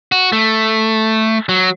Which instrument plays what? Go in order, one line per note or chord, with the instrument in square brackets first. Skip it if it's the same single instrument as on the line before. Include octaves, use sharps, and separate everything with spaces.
[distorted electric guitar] F#4
A3
F#3